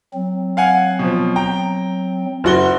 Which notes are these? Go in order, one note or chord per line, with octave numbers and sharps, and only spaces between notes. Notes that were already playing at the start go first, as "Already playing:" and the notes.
F#3 C4
F5 F#5 G#5
B2 F3
G5 A#5
F#1 F#4 G7